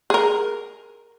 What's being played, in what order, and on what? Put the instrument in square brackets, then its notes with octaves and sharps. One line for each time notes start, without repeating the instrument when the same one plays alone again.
[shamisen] G#4 A#4